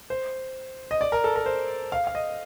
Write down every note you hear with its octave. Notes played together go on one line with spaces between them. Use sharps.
C5
D#5
D5
A#4
A4
A#4
C5
F5
F5
D#5